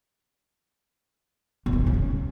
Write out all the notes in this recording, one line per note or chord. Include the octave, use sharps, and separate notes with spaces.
A#2
B2
A#2
A2
C#3